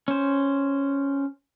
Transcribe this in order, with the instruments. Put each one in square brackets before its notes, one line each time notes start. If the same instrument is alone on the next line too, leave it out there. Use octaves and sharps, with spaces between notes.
[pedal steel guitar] C#4 C5